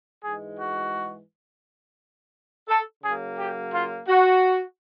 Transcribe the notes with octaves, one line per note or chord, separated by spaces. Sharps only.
G#2 E3 G#3 G#4
F#4
A4
C#3 F#3 A#3 G#4
G4
F4
F#4